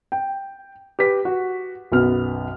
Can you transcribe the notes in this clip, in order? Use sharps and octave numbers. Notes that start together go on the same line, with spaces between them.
G5
G4 B4 B6
F#4
B1 F#2 B3 F6